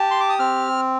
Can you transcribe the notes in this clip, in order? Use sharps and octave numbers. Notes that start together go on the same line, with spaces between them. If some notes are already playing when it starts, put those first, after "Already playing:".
Already playing: G4 A5
C6
D6
D#6
C4 F6